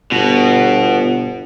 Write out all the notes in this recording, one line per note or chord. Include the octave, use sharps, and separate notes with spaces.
G1 B2